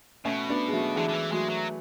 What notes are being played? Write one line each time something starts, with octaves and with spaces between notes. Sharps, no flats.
B2 A3 C#4
B3 D4
G#3
F#3 A3
D3 E3 G#3
D3
E3
F#3 G#3 A3
F#3